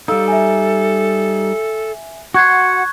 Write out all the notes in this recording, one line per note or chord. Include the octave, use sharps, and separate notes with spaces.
G3 D#4 A4 F5 E6
E5 G#5
F#4 F#5 C6 C#6 F#6 G#6